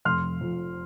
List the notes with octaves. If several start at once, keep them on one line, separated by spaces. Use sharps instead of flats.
F1 C6 F6
F2